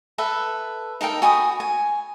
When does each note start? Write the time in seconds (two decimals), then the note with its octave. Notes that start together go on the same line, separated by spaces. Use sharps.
0.18 A4 B4 E5
1.01 D#4 A4 A#4 G5
1.22 F#4 G#5 B5 D#6
1.60 G#5